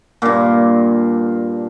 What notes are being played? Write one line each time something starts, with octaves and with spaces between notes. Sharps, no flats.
G2 A#2